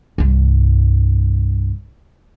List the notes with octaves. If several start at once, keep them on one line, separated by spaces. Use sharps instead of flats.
C2 G2